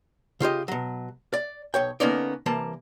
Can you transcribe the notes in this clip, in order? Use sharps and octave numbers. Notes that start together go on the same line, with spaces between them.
C#3 F4 G4 D#5
B2 F#3
D5
B1 C#5 G5
D3 A#3 B3 C#4 D#4 D5
C2 E3 A#3 A5